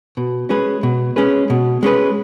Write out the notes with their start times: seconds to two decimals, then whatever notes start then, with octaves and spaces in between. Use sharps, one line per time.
0.17 B2
0.49 G#3 C#4 G#4 B4
0.83 B2
1.16 G#3 C#4 G#4 B4
1.50 B2
1.83 G#3 C#4 G#4 B4